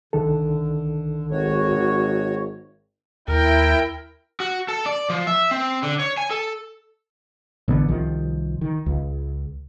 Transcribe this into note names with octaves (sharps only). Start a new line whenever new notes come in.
C2 D3 D#3 A4
G#1 F#4 C#5
D#2 E4 A#4 G5
F#4
A4
D5
F3
E5
C4
D3
C#5
G#5
A4
A1 D3 B3
C2 D#3 F3
D#3
C#2